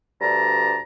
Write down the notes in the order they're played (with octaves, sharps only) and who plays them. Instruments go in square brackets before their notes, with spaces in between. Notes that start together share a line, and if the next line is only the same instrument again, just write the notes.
[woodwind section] D2 G2 G3 A5 A#5